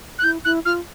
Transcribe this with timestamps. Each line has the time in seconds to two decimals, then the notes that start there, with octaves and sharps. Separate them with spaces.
0.18 F#6
0.23 E4 G6
0.44 E4 F#6
0.65 F4 F6